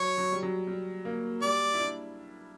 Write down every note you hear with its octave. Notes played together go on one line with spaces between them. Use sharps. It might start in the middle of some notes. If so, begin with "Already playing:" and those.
Already playing: F#3 C#5
F#3
G3
F#3
G3
A#3
G3 D5
E4
D4